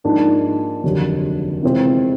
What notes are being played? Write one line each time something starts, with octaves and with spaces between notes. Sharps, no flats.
G#2 F3 A#3 D4
F1 D#2 D3 F#3
C3 E3 G#3 C4 F4